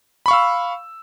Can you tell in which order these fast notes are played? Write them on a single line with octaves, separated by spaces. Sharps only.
B5 C#6 F5 E6